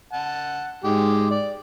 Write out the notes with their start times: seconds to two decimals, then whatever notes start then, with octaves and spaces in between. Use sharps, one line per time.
0.13 F#5 A5
0.84 G#2 G#3 G4
1.31 D5